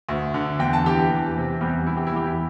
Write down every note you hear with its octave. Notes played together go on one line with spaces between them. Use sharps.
D2
D3
E2 G5
A5
E3 G4 G5
E2
C3
E2 G3 G4
E3 E4
G4
E4
E2 G4
E4